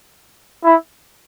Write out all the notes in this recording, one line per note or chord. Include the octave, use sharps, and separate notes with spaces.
E4